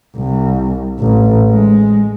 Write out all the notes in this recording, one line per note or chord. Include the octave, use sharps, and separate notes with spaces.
C2
A1
G#3